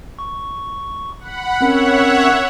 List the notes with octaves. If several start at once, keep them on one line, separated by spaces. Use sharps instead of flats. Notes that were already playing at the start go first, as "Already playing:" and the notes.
C#6
F#5 B5
C4 C#4 A#4 C#5 E5 F#5